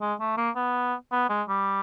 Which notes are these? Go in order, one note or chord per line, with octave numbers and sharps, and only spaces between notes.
G#3
A3
A#3
B3
B3
G#3
G3